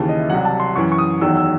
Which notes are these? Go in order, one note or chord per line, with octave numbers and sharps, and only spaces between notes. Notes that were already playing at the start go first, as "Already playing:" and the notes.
Already playing: D#2 C#3 E3 A5
D#5
E5
C2 C3 F#3 F#5
A5
C6
F#2 E3 C#6
C#6
D#6
E2 D#3 F#3 E6
E6